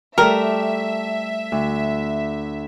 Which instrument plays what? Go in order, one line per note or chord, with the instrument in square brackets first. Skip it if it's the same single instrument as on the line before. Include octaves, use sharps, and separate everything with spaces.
[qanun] G3 A3 [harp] A4 [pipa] A#4 [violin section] E5
[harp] D2